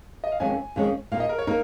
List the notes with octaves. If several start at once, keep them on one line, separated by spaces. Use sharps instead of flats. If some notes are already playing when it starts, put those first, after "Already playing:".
D#5
F5
F2 D#3 G#3 C#4 G#5
F2 D#3 G#3 C#4
A#2 A#3 D#4 F5
D#5
A#4
C#5
A#3 D#4 A#4